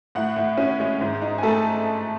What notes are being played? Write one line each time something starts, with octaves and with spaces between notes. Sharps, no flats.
A2 F#5
A2
C#4
G#3
G#2
D#4
G#5
A3 A4 A5